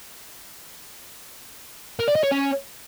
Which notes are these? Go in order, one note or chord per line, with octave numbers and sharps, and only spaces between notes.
A#4
D5
D#5
C#5
C#4